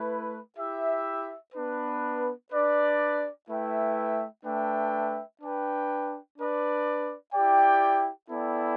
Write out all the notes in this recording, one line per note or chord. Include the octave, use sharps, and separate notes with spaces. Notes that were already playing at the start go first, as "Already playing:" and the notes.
Already playing: A3 E4 B4
E4 G4 E5
B3 D4 B4
D4 B4 D5
A3 E4 B4 E5 G5
A3 D4 B4 E5 G5
D4 B4 G5
D4 B4 D5
E4 G4 D5 G5
B3 E4 A4 D5 G5